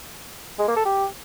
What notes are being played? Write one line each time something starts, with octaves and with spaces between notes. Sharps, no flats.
G#3
A#3
A4
G4